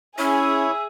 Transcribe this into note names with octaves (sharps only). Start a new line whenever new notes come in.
C#4 E4 G#4 C#5 E5